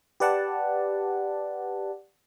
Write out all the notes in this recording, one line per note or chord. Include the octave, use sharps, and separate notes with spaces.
G4 B4 D5 F#5 A5